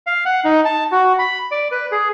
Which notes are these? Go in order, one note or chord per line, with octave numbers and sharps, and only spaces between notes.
F5
F#5
D#4
A5
F#4
B5
D5
B4
G#4